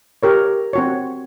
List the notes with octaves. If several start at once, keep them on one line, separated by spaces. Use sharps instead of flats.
G4 A#4 C#5
C4 F#4 C#5